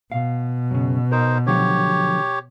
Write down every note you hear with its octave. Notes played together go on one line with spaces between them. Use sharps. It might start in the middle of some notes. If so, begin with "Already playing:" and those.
B2 F5
F#2 C#3
D#4 A#4 C5
D3 F3 F#3 G4 C#5